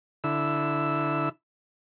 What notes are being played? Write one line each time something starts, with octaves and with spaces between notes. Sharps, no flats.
D3 E4 E6